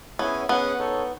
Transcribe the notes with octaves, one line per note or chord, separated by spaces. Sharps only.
B3 C#4 E4 G#4 C#5 G#5
B3 C#4 G#4 D#5 F#5
D#4 A4 C#5